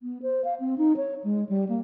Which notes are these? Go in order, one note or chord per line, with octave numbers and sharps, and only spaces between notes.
B3
C5
F5
C4
D#4
C#5
G#3
G3
A#3